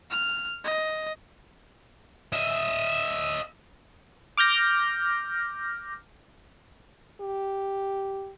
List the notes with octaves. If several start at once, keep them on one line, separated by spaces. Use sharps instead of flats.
F6
D#5
D#5 E5
D6 F6 G6 A#6
G4